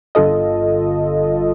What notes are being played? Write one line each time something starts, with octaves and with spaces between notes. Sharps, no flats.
G1 F4 A4 D#5